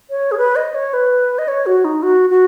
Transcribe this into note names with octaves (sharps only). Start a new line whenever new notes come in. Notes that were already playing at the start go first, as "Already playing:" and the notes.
C#5
G#4
B4
D#5
C#5
B4
D#5
C#5
F#4
D#4
F#4
F#4